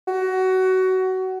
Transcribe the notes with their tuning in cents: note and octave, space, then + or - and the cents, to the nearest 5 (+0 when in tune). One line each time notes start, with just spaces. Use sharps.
F#4 +20